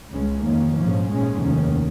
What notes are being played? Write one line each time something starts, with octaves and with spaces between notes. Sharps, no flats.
C#2 C#3 G#3 C#4
F2 D#3 A#3 C#4
A#1 G#2 F3 C#4
A#1 G#2 G#3 C#4
F1 D#2 D#3 C#4